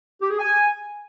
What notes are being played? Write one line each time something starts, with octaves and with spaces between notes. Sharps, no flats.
G4
G#4
G#5